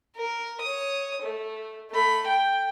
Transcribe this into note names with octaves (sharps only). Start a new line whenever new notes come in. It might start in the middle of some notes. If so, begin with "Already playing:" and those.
A#4
C#5 D#6
A3
A3 B5
G5